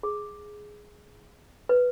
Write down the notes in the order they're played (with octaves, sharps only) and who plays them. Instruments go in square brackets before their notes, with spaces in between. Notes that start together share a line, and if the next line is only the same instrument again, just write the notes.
[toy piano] G#4
B4